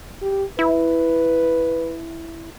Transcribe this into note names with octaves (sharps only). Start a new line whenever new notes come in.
G4
E4 B4